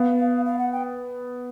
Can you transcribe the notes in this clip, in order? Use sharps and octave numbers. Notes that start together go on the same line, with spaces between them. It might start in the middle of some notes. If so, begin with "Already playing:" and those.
Already playing: B3 F5
F5
F#5
G5